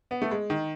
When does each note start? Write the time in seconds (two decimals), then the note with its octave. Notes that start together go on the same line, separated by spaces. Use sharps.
0.11 B3
0.22 A3
0.31 G#3
0.50 D#3